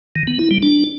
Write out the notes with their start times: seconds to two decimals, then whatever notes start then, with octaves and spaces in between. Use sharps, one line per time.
0.16 D#3
0.27 B3
0.39 E4
0.51 G3
0.63 D4